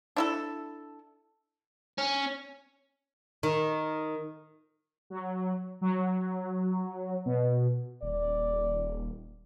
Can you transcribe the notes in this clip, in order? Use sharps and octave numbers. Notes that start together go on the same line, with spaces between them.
D4 E4 A4
C#4
D#3
F#3
F#3
B2
D#1 D5